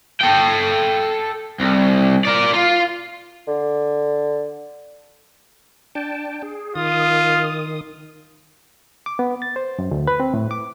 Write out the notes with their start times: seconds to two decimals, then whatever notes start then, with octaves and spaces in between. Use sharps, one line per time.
0.21 A4 G5
1.60 C2
2.25 A#4 D5
2.53 F4
3.48 D3
5.95 D4 G5 A5
6.43 G#4
6.75 D#3 F4 D#6
9.06 D6
9.19 B3
9.42 A6
9.56 C5
9.79 F#2
9.91 D2
10.08 B4
10.20 C4
10.34 A2
10.51 D6